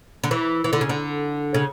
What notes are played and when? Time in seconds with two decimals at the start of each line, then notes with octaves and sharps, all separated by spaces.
0.24 D3
0.31 E3
0.64 E3
0.73 D3
0.81 C#3
0.89 D3
1.54 C#3